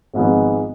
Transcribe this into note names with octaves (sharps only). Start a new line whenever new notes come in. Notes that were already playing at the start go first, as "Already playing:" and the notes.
G#1 G#2 F3 G#3 B3